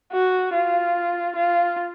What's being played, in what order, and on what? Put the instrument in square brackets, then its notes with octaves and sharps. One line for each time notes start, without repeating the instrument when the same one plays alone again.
[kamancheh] F#4
F4
F4